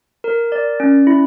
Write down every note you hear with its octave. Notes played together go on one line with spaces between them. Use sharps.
A#4
D5
C#4
E4